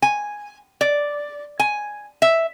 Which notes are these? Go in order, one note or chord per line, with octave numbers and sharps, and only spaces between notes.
G#5
D5
G#5
E5